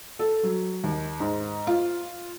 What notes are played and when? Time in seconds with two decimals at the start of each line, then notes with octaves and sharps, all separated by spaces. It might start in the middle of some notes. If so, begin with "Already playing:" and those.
0.19 A4
0.43 F#3
0.84 D#2
1.20 G#2
1.67 F4